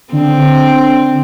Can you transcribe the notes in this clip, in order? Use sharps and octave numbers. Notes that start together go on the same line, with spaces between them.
D3 C4